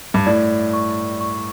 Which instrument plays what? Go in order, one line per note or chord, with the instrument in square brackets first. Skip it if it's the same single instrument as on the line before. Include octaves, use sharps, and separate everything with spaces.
[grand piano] G2
[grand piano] A2 [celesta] D5
[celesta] C#6
C#6